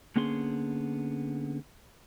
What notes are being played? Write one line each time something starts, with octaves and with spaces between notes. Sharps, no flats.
D3 A#3 B3 C#4 G#4 C6